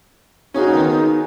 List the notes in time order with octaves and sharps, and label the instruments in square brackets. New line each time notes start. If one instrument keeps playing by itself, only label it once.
[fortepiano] C#4 [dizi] D#4 [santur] F#4 G#4 C#5
[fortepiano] D#3 B3 F4